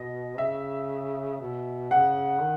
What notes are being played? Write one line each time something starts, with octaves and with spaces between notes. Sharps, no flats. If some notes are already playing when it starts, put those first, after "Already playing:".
Already playing: B2 D#5
C#3 E5
B2
C#3 F#5
D#3